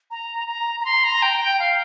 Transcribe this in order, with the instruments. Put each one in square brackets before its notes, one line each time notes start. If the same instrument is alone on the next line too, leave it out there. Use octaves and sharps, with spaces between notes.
[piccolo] A#5
A#5
A#5
C6
A#5
G5
G5
F5